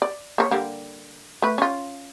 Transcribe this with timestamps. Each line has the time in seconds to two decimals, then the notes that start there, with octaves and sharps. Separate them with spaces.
0.02 D5
0.38 A#3 A4 C#5
0.51 D3 G3 A#3
1.42 A3 B4
1.58 C#4 F4